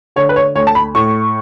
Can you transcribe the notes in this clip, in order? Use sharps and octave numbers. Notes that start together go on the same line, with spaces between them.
D3 C#5
B4
C#5
D2 C#5
A5
B5
A2 C#6